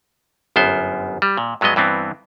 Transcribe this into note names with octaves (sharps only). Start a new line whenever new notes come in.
G1 F#2 B3 C5
G3
A#2
G2 F#3 G#3 B3 D#5
G2 E3 B3 C4